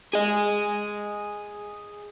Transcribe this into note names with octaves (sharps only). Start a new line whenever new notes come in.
G#4 D#5